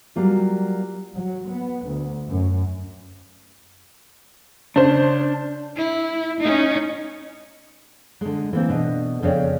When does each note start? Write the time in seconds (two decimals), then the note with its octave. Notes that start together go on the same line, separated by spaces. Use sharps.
0.16 F#3 G3 A#3 F4
1.15 F#3
1.50 B3
1.85 D2
2.28 F#2
4.76 C#3 D4 C5
5.77 E4
6.41 C#4 D#4
8.21 D3 G#3
8.53 E3 A#3 C4
8.69 B2 D4 D#5
9.22 F2 C#3 G#4 C#5 D5 G5